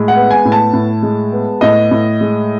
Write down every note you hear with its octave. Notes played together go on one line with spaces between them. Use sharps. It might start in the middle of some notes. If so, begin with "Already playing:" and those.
Already playing: A2 G#3
F#5
B3
G#5
A2
A5
A2
G#3
B3
A2 D#5
A2
G#3